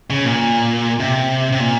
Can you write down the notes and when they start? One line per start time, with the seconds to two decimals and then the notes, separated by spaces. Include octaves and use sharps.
0.10 C#3
0.25 A#2
1.00 C3
1.52 C3
1.60 A#2